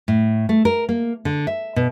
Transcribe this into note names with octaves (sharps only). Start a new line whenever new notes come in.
A2
A3
A#4
A#3
D3
E5
B2